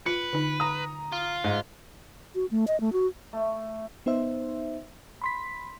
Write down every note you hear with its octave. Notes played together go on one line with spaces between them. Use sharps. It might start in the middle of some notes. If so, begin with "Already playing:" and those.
F4 B4 C#7
D3 D#4
A#5 D#6
F4
G#2
F#4
A3
D#5
A3
F#4
A3
B3 D#4 C5 E5
B5 C6 B6